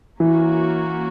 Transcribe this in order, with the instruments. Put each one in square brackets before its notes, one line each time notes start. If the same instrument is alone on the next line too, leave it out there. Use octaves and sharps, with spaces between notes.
[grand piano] E3 [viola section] A#3 C#4 F#4